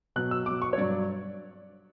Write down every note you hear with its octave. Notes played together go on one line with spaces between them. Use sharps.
B2 F#3 F#6
E6
B2 F#3 D6
C#6
C#5
G2 F#3 D5